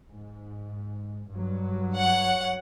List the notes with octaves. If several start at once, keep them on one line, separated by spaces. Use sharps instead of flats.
G#2
G2 F#3
C#5 F#5